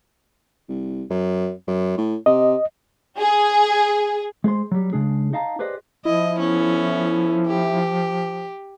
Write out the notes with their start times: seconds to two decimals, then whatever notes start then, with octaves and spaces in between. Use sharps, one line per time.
0.68 C2
1.10 F#2
1.67 F#2
1.98 A2
2.26 C3 D#5
3.19 G#4
4.44 G#3 G#4 C5 C6
4.72 F#3 G3
4.93 C#3 G#3 D4 G#4
5.33 D#4 D#5 F5 A5 A#5
5.59 G4 G#4 B4 C5 D5 D#5
6.05 F3 E4 D#5
6.38 B3 C#4 A4
7.47 G4